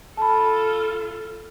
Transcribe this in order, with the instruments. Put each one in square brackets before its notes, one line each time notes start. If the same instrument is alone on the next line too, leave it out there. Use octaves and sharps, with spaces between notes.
[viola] F4 A4 [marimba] A5 B5